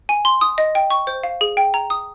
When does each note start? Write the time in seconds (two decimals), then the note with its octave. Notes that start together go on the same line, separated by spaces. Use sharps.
0.09 G#5
0.25 C6
0.41 D#6
0.58 D#5
0.75 G5
0.90 C#6
1.07 C5
1.23 F5
1.41 G#4
1.57 G5
1.74 A#5
1.90 D#6